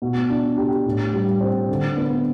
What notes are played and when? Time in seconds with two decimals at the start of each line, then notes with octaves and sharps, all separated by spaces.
0.02 B2
0.30 D4
0.57 G4
0.86 A2
1.13 G3
1.41 C4
1.69 D3
1.97 B3